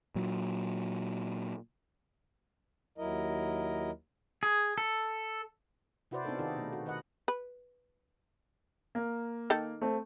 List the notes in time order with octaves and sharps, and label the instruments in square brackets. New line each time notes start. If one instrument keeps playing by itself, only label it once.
[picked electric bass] A#2 F#3
[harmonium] D#2 F#3 E4 A#4 D#5
[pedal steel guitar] G#4
A4
[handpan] C3 E4 F#4 B4 C5 D5
B3 C4 D4 D#4 A4 A#4
D#3 D#4 F4 G#4 A4 D5
B2 A3
F#4
D#3 B4 D#5 F#5
[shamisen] B4
[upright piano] A#3
[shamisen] D#3 A4
[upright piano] A3 C4